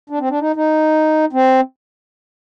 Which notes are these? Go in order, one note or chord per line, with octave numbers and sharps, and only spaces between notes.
D4
C4
D4
D#4
D#4
C4